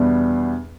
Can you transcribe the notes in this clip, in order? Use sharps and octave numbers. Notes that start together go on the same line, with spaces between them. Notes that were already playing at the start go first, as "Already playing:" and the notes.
Already playing: E2 B2 G3 B3 D4